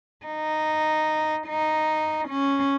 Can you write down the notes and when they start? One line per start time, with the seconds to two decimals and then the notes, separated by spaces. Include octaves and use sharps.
0.26 D#4
1.47 D#4
2.29 C#4